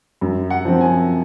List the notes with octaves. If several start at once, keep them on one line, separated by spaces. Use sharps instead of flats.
F#2
F#5
F3 C4
G#5